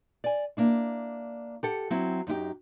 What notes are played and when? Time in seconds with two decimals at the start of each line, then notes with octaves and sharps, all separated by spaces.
0.24 D5 G#5
0.57 A#3 D4 E4
1.63 G4 A4 F#5
1.90 F#3 C4 E4
2.27 F#2 D#4 E4 G4